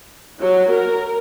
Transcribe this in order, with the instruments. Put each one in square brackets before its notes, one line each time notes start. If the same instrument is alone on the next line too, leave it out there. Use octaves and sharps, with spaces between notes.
[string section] F#3
A#4